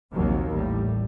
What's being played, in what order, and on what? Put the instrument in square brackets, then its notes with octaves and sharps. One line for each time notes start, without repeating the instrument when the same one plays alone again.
[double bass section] A#1 D#2 C3 F#3 A#3
A1 A2 G3